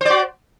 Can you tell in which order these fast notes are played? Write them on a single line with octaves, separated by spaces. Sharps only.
C5 D5 F#4